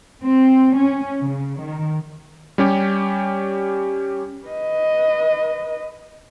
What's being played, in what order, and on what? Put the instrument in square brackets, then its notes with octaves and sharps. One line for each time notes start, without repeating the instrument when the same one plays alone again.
[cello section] C4
C#4
C#3
D#3
[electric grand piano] G3 C#4 G4
[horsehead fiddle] B4 D#5